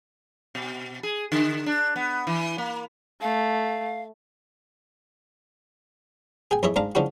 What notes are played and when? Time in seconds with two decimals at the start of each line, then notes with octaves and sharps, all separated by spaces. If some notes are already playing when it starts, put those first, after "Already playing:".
0.55 B2
1.03 G#4
1.32 D3
1.66 D4
1.96 B3
2.27 E3
2.58 A#3
3.21 A3 F5
6.51 G#4 G5 G#5
6.63 F2 E4 G#4 C#5 D#5 E5
6.76 G#2 D4 F5 A#5
6.95 C#3 F3 D4 E4 F#4